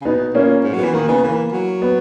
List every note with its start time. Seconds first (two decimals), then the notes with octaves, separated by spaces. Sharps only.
0.01 C#3
0.05 B2 B3 D#4
0.35 A#2 A#3 C#4
0.64 G#2
0.74 F#3
0.79 E3 B3
0.94 D#3 A#3
1.08 C#3 B3
1.23 E3 A#3
1.52 F#3
1.82 B3